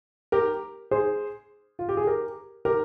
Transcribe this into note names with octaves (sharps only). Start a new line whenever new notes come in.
G4 A#4
G#4 C5
F4
G4
G#4
G4 A#4
G4 A#4